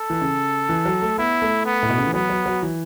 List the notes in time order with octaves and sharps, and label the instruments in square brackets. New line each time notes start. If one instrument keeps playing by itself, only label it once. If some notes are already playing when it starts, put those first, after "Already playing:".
Already playing: [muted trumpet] A4
[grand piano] E3
C#3
E3
F#3
A3
[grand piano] B3 [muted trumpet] E4
[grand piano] A3
[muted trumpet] B3
[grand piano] A2
B2
C#3
E3
[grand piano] F#3 [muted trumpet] B3
[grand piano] F#3
F#3
E3